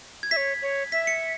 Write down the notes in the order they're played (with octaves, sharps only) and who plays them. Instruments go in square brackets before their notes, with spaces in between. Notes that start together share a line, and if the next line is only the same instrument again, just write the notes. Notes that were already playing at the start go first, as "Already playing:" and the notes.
[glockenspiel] G#6
[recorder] E5 [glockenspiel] B6
[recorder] C#5
C#5
[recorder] E5 [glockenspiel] B6
[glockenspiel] C#7